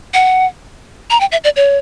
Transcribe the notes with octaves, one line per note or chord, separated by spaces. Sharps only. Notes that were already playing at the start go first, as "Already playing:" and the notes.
F#5
A#5
G5
E5
D5
C#5